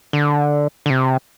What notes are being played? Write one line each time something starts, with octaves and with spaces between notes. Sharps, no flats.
D3
D3
C3